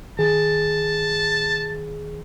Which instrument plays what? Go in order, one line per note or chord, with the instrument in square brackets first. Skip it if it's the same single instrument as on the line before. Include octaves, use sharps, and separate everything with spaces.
[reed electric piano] D#3 G#4 [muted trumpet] A5